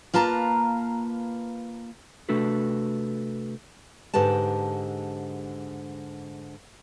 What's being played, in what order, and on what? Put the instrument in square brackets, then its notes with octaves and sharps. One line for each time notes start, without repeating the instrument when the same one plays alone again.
[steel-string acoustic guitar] A#3 F4 B4 A5 A#5
[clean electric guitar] C3 A3 D4 F#4 A4 B4
[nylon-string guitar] G#2 D3 G4 B4 A5